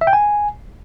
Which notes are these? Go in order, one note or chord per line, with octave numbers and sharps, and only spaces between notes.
E5
G5
G#5